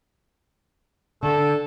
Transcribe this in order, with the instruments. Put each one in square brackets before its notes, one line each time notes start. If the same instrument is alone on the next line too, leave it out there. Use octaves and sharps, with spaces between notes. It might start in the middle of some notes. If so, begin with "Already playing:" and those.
[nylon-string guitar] D3 [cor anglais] A4